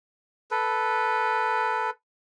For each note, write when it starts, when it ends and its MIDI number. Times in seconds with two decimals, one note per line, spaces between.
0.51 1.90 69
0.51 1.90 71